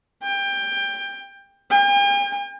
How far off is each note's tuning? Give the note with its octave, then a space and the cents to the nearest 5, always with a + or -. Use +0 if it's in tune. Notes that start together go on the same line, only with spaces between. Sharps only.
G5 +20
G5 +45